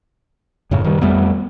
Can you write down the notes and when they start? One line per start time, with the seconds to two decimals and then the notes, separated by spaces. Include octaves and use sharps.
0.71 F#2 A2 C#3
0.84 D#3 G3
1.01 F2 G3 A3 B3